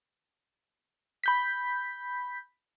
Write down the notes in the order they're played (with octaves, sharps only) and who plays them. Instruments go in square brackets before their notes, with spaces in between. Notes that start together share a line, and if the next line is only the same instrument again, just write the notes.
[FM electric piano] B5 G6 B6